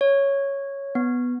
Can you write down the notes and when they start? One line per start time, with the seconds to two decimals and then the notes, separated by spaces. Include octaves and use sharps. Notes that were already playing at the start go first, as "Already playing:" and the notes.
0.01 C#5
0.95 B3